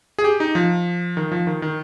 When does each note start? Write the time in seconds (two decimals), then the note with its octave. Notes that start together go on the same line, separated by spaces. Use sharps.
0.19 G#4
0.24 G4
0.40 D#4
0.55 F3
1.17 D#3
1.32 F3
1.47 D#3
1.62 D#3